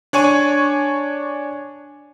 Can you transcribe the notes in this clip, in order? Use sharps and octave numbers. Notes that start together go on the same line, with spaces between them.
D4 C#5 G#5 C#6 D#7